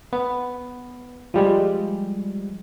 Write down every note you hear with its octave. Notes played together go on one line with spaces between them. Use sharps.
B3
F3 G3 G#3